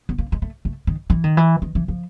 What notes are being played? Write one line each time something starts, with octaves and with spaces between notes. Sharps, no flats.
B3
A#3
G#3
A3
A3
D#3
E3
D#3
E3
D#3
E3
F3